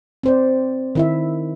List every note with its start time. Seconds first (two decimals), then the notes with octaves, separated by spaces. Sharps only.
0.23 C4 C5 D5
0.95 D#3 E4 E5